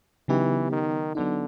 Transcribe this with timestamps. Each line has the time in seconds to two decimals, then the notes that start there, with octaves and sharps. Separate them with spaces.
0.28 C#3 E3 F#3 B3 D#4 G4
0.72 D#3
1.15 D3 F#3 B3 D#4